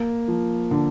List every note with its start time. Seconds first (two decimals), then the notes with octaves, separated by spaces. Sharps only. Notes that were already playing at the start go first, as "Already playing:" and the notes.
Already playing: A#3
0.28 F3
0.71 D3